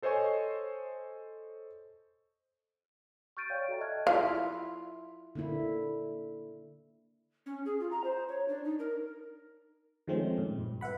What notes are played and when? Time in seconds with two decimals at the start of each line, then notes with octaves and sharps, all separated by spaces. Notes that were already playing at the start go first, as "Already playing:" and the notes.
0.02 A4 C5 C#5 D#5 G#5 C#6
3.37 C#6 F6 G6 A6 D7 D#7
3.50 C#5 D5 F5 G5 C#6
3.68 F#4 A4 D#5 E5 G5 A#5
3.81 D#5 E5 A5 F6 F#6 G#6
4.07 E4 F4 E5 F5
5.35 D3 A#3 E4
7.46 C#4
7.65 G#4
7.80 F4
7.91 A#5
8.04 C5
8.28 C#5
8.48 D4
8.64 D#4
8.79 A#4
10.07 D#3 F3 G#3 A3 C4 C#4
10.38 A#2
10.59 G2
10.81 B4 E5 F#5 B5